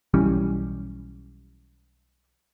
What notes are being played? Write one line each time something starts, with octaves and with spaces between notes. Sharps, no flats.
B1 E3 G3 C#4